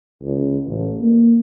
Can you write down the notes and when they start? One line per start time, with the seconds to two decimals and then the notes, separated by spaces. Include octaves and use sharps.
0.22 C#2
0.66 A1
1.01 A#3